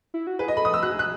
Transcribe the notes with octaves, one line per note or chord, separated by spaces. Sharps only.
E4
F#4
G#4 B4
D#5
A4 B5
D#6
E6
F#4 F#6
G#4
F#6